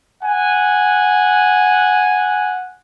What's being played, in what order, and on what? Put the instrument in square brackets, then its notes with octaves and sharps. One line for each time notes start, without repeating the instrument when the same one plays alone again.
[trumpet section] F#5 G#5